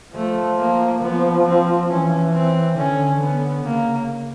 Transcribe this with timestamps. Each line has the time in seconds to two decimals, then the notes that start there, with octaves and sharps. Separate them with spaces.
0.15 F3 A3
0.58 A#3
1.02 F3 B3
1.47 C4
1.90 E3 C#4
2.34 C4
2.78 D3 C#4
3.21 B3
3.65 C#3 A#3